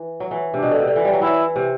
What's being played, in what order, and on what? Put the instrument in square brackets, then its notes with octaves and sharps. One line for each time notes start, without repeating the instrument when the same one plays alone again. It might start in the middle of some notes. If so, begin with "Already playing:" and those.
Already playing: [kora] E3
F#3
E3
[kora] C3 [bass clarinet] D4
[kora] B2
D3
C3
D3
E3
G3
F#3
[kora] E3 [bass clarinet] E4
[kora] C3